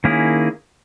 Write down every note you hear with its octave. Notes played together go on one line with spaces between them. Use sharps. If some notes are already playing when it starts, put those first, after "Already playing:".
D#3 A#3 C#4 E4 G#4